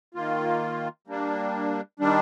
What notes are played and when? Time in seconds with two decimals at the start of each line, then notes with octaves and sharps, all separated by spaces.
0.14 D#3 A#3 F4
1.07 G3 A#3 D4
1.99 D#3 G3 D4